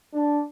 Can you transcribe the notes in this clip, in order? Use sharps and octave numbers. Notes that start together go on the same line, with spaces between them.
D4